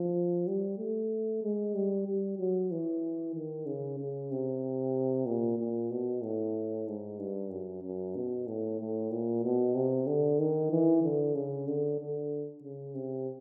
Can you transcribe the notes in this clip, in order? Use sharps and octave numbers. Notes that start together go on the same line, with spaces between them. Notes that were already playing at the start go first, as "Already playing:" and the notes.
Already playing: F3
G3
A3
G#3
G3
G3
F#3
E3
D#3
C#3
C#3
C3
A#2
A#2
B2
A2
G#2
G2
F#2
F#2
B2
A2
A2
A#2
B2
C3
D3
D#3
E3
D3
C#3
D3
D3
C#3
C3